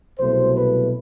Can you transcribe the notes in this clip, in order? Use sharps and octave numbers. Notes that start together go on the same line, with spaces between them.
C2 B2 F#3 A3 C5
B4